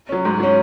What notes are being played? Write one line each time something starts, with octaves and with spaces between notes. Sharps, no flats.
F#3 C#4
G#2
F#3 C#4